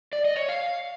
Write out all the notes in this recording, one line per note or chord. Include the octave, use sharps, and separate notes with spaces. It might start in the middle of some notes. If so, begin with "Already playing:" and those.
D5
D#5
C#5
F5